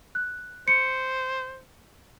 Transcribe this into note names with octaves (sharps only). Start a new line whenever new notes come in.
F#6
C5 C#7